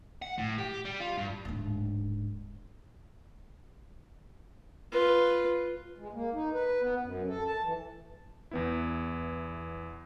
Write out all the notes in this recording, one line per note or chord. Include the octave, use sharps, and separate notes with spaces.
F#5
A2
G4
G3
F4
G2
D1 G#2
F4 B4
G#3
A#3
D#4
B4
B3
F#2
A4
A5
E3
E2 B3 E4